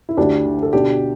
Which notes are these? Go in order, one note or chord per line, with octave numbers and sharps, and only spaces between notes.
E4
D2 D4 G4
D3
A4
B2 D4 G4